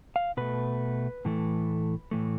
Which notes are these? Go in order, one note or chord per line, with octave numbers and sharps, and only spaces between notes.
F5
B2 A3 B4
A2 E3 A3
A2 E3 A3